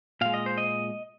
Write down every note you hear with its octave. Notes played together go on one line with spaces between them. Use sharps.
A#2 G#3 F5
D#5
C5
D#5